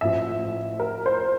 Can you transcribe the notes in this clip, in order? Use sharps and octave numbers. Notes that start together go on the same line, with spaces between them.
A1 A2 F3 E5
A#4
C5